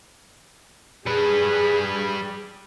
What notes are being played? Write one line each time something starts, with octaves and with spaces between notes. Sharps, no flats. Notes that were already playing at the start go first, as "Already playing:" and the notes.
G3 G#4 B4